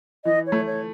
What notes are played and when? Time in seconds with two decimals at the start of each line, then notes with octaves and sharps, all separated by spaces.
0.25 E3 D#5
0.46 C#5
0.52 A3
0.66 C#5